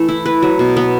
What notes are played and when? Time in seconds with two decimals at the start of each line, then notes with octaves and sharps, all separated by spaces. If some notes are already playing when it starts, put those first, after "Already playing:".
Already playing: E3 A3
0.09 E4
0.26 B4
0.42 F#3
0.59 B2
0.77 B3